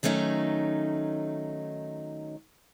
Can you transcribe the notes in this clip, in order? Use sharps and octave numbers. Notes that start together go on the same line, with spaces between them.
D#3 F#3 A3 C#4 D#4